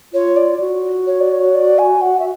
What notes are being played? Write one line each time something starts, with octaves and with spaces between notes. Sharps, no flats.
F4 C#5
D5
F#4
C#5
D5
C#5
D5
G#5
F#5
E5